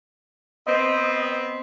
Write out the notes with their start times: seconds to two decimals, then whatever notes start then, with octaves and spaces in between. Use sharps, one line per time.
0.67 B3 C4 D#5